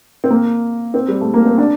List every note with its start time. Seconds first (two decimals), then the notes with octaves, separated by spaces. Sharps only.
0.24 C4
0.30 A#3
0.94 C4
1.08 G3
1.21 A3
1.34 A#3
1.45 C4
1.58 D4